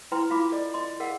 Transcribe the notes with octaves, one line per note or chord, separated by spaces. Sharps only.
E4 B4 G5 A#5 C6
E4 F4 F5 B5 D6
A4 D5 D#5
D#5 C6
G#4 A#4 F5 F#5